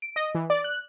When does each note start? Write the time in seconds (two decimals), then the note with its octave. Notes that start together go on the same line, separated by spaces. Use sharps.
0.02 D7
0.16 D#5
0.35 E3
0.50 D5
0.64 F#6